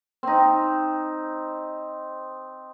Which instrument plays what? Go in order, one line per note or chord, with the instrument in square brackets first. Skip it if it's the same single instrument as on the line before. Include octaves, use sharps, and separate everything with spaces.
[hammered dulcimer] C4 D#4